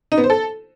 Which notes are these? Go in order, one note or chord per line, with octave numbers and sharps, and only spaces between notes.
D#4
B3
C5
A4